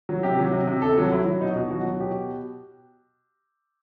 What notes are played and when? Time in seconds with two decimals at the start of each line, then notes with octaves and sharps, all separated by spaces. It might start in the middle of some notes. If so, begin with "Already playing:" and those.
0.09 F#3
0.23 C3 G4
0.39 F#3
0.52 C3
0.67 C3
0.82 C3 A4
0.98 F#3
1.12 F#3 E4
1.26 F#3
1.41 B2 D#4
1.56 B2
1.70 F#3 F#4
1.84 F#3
1.99 B2 G4